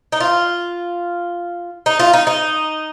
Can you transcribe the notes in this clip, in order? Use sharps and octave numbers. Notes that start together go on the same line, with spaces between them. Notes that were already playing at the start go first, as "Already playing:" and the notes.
D#4
F4
D#4
F4
D#4
D#4